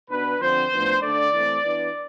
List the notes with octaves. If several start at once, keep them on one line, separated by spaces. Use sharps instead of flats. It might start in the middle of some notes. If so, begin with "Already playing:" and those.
B2 B3 D4 B4
D3 F3 C4 C5
A2 F3 B3 D4
D3 A3 D4 D5
E3 A3 C4
E3 B3 D4